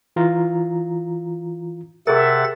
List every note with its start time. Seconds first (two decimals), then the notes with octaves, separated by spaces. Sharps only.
0.16 E3 F4 A#5
2.07 C3 G#4 A#4 E5 F#5 A6